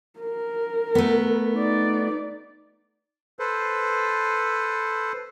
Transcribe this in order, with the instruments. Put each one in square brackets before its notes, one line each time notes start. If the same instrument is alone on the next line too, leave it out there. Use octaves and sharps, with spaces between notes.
[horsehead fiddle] A#4
[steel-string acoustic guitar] A3 B3
[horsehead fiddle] D#4 D5
[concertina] A4 B4 C5